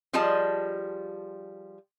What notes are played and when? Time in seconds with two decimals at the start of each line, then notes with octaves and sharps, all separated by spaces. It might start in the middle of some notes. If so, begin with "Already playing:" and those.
0.13 F3 G3 F4 G#4 D#5 A5